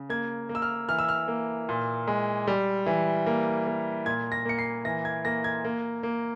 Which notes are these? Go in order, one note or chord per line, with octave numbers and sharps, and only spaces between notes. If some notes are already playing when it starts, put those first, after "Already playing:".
Already playing: C#3
A#3 G#6
A#3
E6
F6
E3 F6
E6
F6
A#3
A#2
G#3
G3
E3
A#3
A#3
A#2 G#6
A#6
A#3 C#7
C7
E3 A#6
G#6
A#3 A#6
G#6
A#3
A#3